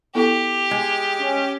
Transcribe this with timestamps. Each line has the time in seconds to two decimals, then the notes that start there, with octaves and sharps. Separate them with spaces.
0.15 B3 E4 G4 A4
0.71 G#3
1.20 C#4